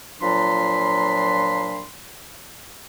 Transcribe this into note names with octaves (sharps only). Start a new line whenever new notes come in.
A#2 F3 F#3 D4 B5 C6